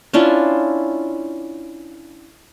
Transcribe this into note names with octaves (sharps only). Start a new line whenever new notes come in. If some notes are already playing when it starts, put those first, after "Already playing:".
C#4 D4 E4 F4